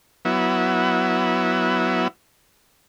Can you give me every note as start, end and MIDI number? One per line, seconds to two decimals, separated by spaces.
0.25 2.08 54
0.25 2.08 59
0.25 2.08 64